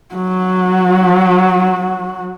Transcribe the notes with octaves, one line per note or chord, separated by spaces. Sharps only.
F#3 F#4